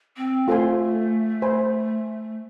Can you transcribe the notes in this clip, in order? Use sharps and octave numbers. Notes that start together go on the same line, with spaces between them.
C4
A3 F4 A4 C5 G#5 C6
C5 G#5 B5